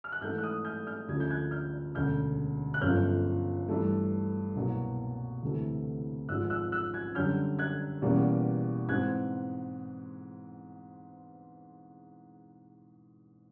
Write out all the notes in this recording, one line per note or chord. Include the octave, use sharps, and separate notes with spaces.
F6
F#6
G#2 E3 A3 F6 G6
F#6
D#6 F6
F6 G6
F6 G6
D2 C#3 F3 G#6
G6
F#6 G#6
F6 G6
E1 D2 C#3 F6 G6
F#6
G1 F#2 C#3 F3 F6 G6
G2 E3 A3
C2 B2 F#3 A#3
D2 C3 E3 A3
G#1 G#2 F3 G#3 E6 F#6
E6 F#6
E6 F#6
F#6 G#6
F#2 D3 G3 F6 G6
F#6 G#6
E2 B2 G3 A#3 C#4
G#2 E3 G#3 C4 F#6 G#6